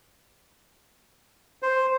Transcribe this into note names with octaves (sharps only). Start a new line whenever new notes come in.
C5